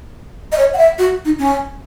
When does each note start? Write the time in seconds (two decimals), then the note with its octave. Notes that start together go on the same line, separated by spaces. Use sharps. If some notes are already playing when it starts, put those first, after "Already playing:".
0.52 D#5
0.58 C#5
0.74 F#5
0.78 E5
0.98 F#4
1.25 D#4
1.39 C#4